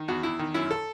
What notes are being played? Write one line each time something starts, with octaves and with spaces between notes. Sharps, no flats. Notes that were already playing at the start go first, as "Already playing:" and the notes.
Already playing: D#3
E2 F#4
E2 E4
D#3
F#2 E4
A4